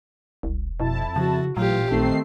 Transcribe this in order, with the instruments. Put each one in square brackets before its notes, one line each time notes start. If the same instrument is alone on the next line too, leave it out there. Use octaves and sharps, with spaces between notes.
[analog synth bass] E1 [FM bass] C2
[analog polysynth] F2 E4 A5 [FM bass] B2
[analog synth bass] C#3 [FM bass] F3 [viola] F#4
[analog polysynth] A1 [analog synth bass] A#2 [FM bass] F#3 [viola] F4 G4
[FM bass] A1 [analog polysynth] D#3 C4 C7 [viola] A3